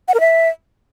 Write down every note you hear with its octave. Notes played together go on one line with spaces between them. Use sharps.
F#5
A#4
E5